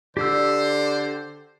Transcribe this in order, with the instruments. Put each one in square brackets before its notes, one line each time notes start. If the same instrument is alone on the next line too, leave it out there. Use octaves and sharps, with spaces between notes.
[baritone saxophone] D3 [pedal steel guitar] G4 E6 [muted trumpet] C5 [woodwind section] D5